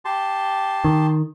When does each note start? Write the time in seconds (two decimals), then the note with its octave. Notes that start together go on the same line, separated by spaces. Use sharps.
0.05 G4 A5 C6
0.84 D#3